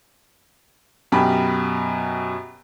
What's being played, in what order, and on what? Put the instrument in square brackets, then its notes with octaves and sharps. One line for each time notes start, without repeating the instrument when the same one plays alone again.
[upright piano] F#2 B2 G4 B5